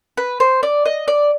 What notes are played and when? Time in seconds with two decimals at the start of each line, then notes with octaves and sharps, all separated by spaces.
0.17 B4
0.40 C5
0.63 D5
0.86 D#5
1.08 D5